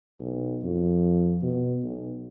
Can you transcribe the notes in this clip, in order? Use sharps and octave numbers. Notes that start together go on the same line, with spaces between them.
B1
F2
B2
B1